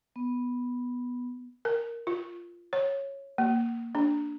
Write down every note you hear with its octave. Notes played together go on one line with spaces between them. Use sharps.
B3
A#4
F4
C#5
A#3
D4